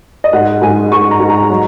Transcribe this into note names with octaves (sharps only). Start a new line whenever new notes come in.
D#5
G#2 F#5
G#2 G#5
G#2 C#6
A#5
G#2
A#5
F#3